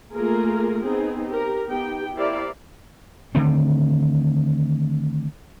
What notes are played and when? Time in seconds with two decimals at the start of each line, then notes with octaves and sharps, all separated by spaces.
0.14 A3 A#3 F4 G#4 A#4
0.83 B3 C4 D#4 G#4
1.29 G4 A#4
1.68 B3 D#4 G4 G5
2.15 E4 G4 A#4 C5 D5 F5
3.35 D3 D#3 A3 C4